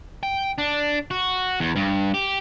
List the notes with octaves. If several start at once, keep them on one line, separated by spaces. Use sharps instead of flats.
G5
D4
F#4
E2
G2
G4